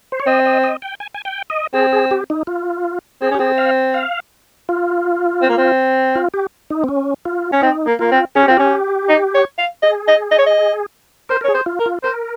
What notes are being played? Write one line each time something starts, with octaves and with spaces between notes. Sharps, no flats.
C5
C#5
C4 D#5
D#5
D#5
G5
G#5
G#5
G5
D#5
C4 G#4
G#4
G4
D#4
F4
C4 G#4
C#4 G4
C4 G#4
F5
F5
F4
C4
A#3
C4
F4
G4
D#4
C4
C#4
F4
C#4
C4 D#4
A#3
A#3 F4
C4
C#4 G#4
G4
C4 F4
C#4 G4
D#4
C#5
F5
G#4 D#5
D#5
D#5
C#5
D#5
A#4 C5
A#4
G#4 C#5
C5
F4
A#4
F4
A#4 C5